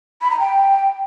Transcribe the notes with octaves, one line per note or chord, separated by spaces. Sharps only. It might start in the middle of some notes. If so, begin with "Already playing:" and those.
B5
A#5
G5